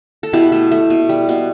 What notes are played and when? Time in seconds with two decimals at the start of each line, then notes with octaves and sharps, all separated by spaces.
0.23 A4
0.33 B2 E4 G4
0.52 A3
0.72 A3
0.90 B2
1.09 G3
1.29 B2